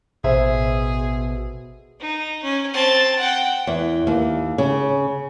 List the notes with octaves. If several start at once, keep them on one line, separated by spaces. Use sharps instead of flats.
A1 B2 G#4 C5 E5
D#4
C#4
C4 A5
F#5 G5
E2
D#2
C#3